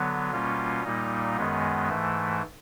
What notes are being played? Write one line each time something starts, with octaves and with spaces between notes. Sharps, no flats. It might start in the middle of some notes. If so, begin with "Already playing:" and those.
Already playing: D3 F#3 B3
B2 G3 A#3 C#4 F4
A#2 G3 A#3 D#4
F#2 D#3 G#3 B3
G#2 E3 A3